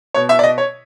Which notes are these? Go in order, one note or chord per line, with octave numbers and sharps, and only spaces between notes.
B2 C#5
E5
D5
D#5
C#5